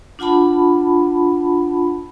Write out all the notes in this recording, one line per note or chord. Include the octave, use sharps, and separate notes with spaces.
D4 F4 F#5 A5 B5